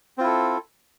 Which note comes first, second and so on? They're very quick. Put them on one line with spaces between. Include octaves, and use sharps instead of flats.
C4 F4 E4 A4